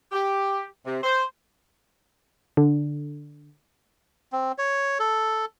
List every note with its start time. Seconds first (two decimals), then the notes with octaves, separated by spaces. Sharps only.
0.12 G4
0.86 C3
1.03 C5
2.57 D3
4.32 C4
4.58 C#5
5.00 A4